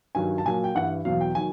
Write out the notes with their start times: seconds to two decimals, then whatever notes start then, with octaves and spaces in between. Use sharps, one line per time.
0.15 G2 D#3 F#3 G#5
0.38 A5
0.45 A#2 F#3 G#5
0.64 G5
0.75 G2 E3 F#5
1.05 E2 B2 F#3 F5
1.21 G5
1.35 D#3 F#3 G#5